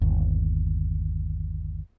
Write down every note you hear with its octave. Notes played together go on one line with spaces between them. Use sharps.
G1 D#2